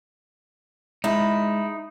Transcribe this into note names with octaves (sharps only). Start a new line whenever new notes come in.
G#3 D#4 E4